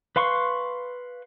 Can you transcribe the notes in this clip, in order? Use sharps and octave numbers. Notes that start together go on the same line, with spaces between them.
B4 F5 C6 C#6